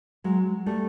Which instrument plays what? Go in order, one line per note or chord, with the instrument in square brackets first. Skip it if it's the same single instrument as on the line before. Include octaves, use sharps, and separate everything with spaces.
[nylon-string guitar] F#3 G#3
G3 A3